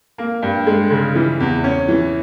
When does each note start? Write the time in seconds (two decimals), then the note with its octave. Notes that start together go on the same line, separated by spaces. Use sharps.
0.18 A#3
0.43 G2
0.67 G#3
0.90 C#3
1.15 E3
1.40 E2
1.64 C#4
1.88 E3